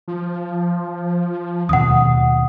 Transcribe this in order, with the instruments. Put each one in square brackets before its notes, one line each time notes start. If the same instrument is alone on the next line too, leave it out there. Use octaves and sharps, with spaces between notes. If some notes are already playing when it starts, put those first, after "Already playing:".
[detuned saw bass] F3
[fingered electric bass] D#2 B2 [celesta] F#5 D#6